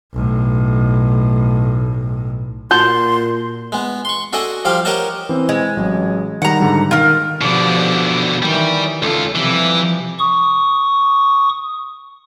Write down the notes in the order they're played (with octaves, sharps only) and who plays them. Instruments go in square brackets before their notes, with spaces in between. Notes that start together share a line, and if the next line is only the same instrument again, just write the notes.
[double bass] B1 A2
[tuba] A#2 [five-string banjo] F4 F#4 A5 [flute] C6 [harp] G6
[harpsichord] G#3 B3
C6 C#6
F#4 G#4 A4 D5 D#5 F#5
F3 G3 G4 F5
G4 A#4 C#5 D#5 F#5 A5
[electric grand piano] E3 C4
[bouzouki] G#3
[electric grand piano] A1 F#3
[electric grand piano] D#3 G3 [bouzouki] F#5 A#5
[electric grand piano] G#2 D3 G3
[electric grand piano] D#3 [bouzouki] F4 A#4
[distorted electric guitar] B2 D3 [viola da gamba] F3 G4 D5
[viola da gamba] D#3 E3 [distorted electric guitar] G3
[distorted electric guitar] C#2 F4 [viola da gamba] A4
[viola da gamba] C3 F3 G3 [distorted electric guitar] E3
[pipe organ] C#6 D#6